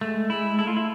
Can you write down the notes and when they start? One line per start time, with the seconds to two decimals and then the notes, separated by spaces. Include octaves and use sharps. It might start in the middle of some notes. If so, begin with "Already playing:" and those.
0.01 G#3 A3
0.30 G#3 E4
0.58 A3 E4
0.67 F4
0.77 E4